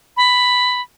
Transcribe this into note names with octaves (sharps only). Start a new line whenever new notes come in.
B5